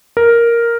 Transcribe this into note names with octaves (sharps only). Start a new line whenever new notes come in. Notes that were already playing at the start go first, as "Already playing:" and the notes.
A#4